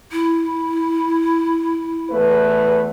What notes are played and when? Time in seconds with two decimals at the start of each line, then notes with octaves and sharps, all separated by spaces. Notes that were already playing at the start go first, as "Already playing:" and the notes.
0.12 E4
2.10 E2 A3 B4